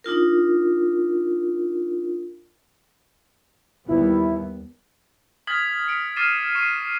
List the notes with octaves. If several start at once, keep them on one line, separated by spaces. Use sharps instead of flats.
D4 D#4 F4 A#4
D#2 G3 B3 E4
D#6 F6 G#6 A6 B6 F#7
B6 C#7 D7 F#7
D6 F6 A6 C7 D#7 E7
C#6 C7 D#7